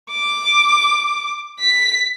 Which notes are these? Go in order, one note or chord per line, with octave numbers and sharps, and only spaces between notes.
D6
B6